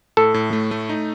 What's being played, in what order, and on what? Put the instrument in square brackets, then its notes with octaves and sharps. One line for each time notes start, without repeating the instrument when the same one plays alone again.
[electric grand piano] A2 [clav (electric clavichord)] A4
[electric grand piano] A2
A3
A3
D#4